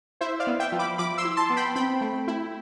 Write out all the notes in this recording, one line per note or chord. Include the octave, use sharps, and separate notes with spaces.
E4 C5 E5
D5 F5
B3
E5 G5
F3
B5 D6
F3 B5 D6
C6 E6
E4
A5 C6
B3
G5 B5
C4 G5 B5
A3
E4